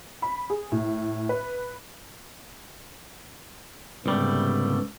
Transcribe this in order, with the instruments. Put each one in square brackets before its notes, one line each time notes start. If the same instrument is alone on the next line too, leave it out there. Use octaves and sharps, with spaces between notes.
[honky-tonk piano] B5
G#4
A2
B4
[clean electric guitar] C2 G3 A3 [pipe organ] G#2 C#3 B3